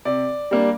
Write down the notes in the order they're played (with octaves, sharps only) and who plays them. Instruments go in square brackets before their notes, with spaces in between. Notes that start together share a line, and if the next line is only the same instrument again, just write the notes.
[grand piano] C3 D5
G3 A#3 D4